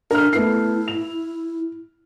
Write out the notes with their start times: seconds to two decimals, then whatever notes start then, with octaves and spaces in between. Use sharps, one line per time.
0.11 D4 A#4 F6
0.33 A3 B3 E4 C7
0.88 F7